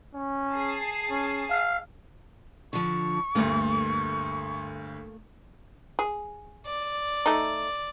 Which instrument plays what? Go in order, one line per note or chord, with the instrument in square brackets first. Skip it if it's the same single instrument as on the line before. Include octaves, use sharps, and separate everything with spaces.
[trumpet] C#4
[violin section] G#4 A5 C7
[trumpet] C#4
F5
[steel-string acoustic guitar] D3 F3 [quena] C#6
[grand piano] D2 G2 [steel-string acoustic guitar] A3 A#3
[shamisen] G#4
[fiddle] D5
[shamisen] A3 D#4